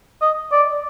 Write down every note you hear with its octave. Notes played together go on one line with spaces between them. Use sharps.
D#5
D5